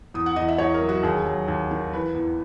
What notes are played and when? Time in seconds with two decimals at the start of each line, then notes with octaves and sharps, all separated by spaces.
0.14 E2 D#6
0.26 F#5
0.36 E2 D#5
0.48 E5
0.58 E2 C#5
0.74 A#4
0.81 F#3
0.89 F#4
1.03 D#2 G#4
1.26 F#3
1.48 D#2
1.71 D#3
1.93 E3 B4
2.15 E2